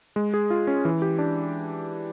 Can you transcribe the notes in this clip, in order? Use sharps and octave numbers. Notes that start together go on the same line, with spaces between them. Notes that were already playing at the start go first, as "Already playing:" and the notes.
G#3
G#4
F4
C#4
E3
G4
D4